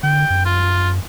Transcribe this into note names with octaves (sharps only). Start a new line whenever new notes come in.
D3 G5
F#2
F4